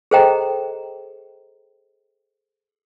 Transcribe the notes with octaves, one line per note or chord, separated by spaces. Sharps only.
G#4 A4 C5 D#5 G5 A#5